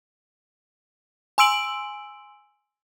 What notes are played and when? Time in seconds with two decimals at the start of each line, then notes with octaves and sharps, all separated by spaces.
1.38 G#5 C6 E6 D7 F#7